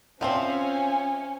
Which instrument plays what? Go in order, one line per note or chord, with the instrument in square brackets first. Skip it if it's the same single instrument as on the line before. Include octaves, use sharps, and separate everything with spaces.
[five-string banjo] F3 C4 [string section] C#4 [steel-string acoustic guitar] C5 E5 F5 [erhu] G#5